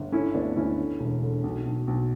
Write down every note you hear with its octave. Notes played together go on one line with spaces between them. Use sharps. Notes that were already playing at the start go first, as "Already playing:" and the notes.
Already playing: G1
D3 C#4 E4
D2 B3 D4
D2 C#4 E4
D3
E1
D3
B1
B1
B1